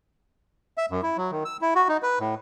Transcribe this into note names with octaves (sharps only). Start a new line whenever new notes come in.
E5
F#2
E4
F#3
D#3
E6
E4
F#4
D#4
B4
A2